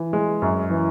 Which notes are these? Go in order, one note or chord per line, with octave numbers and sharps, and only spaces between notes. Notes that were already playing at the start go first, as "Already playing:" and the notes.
Already playing: E3
G#3
F#2
E3